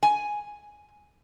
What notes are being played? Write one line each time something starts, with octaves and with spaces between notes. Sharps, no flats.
G#5